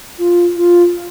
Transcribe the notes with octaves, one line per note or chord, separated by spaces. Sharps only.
F4
F4